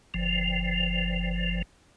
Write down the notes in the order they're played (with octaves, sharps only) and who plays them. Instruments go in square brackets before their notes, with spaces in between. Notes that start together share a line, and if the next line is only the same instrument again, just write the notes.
[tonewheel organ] G1 F3